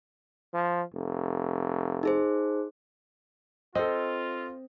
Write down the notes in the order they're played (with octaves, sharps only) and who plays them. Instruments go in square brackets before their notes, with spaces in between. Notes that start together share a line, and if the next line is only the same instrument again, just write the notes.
[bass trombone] F3
F1
[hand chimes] D#4 G#4 C5
[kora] C4 [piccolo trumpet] F4 [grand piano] A4 D#5